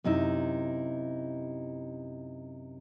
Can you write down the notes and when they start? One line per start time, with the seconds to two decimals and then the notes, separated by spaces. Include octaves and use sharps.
0.04 F#2 C3 D#4 E4